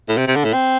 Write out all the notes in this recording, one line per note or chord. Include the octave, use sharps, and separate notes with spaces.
A2
C3
C3
D3
A2
C4